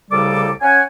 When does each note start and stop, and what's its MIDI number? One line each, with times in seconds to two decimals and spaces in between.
0.11 0.50 36
0.11 0.50 45
0.11 0.50 49
0.11 0.50 55
0.11 0.50 69
0.11 0.50 86
0.61 0.82 61
0.61 0.82 78
0.61 0.82 80